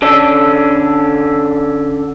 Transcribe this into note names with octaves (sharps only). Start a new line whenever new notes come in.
D3 C#4 D4 A4